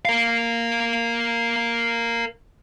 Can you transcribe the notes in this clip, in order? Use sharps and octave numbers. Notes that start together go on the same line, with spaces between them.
A#4 F5